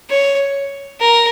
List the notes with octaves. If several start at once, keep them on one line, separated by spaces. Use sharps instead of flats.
C#5
A#4